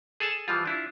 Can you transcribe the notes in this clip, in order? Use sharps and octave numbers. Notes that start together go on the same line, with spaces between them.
G#4 A4 G#5 A5
E3 F3 G3 F4
D4 E4 F4